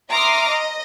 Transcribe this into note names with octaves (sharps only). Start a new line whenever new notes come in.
E5 A#5 C6 D6 D#6 F6
D#5